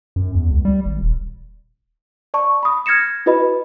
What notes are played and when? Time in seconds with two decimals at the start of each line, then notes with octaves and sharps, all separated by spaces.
0.16 F#2
0.35 E2
0.51 C#2
0.65 G3
0.86 G#1
1.01 D#1
2.34 D5 A5 C#6
2.63 B5 D#6
2.86 F6 G#6 A#6 C#7 E7
3.26 E4 F#4 B4 D#5 B5